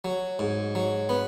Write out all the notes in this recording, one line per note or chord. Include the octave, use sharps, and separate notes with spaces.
F#3
G#2
F#3
B3